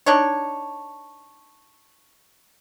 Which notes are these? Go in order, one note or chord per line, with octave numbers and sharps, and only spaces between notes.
D4 D#4 C#5